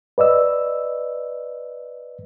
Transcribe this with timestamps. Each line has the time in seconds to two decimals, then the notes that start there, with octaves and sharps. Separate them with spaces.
0.18 B4 D5 D#5 E6